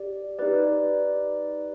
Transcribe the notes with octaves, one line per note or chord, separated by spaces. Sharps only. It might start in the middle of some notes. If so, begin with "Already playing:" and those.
Already playing: G4 D5
D#4 G4 B4 D5